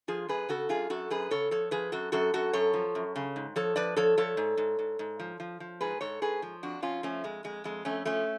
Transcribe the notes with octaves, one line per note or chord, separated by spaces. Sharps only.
F3 F4 G#4
F#2 G#4 B4
C#3 F#4 A4
F#2 F4 G#4
F#2 F#4 A4
F#2 G#4 B4
C#3 A4 C#5
F3 A4 C#5
F3 G#4 B4
F#2 F#4 A4
F#2 F#4 A4
F#2 F#4 A4
F#2 A4 C#5
F3
F#2
C#3
G#2
F3 A4 C#5
F3 B4 D5
F3 A4 C#5
F3 A4 C#5
G#2
G#2
G#2
G#2
F3
F3
F3
G#2 G#4 B4
G#2 A4 C#5
G#2 G#4 B4
F3
F2 D4 F#4
F2 C#4 F4
F3 A3 C#4
F2 G#3
F2 G#3
F2 G#3
F2 A3 C#4
F3 A3 C#4